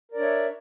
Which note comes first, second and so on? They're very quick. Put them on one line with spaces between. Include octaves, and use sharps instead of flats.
A#4 D5 D4 C#5 E5